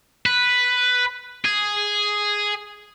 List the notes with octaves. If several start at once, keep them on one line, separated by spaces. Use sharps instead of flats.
B4
G#4